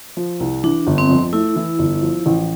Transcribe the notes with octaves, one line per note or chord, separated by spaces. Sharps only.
F3
C2
E3 D4
G1
C4
F2
A3 E4
E3
G1
F3
A1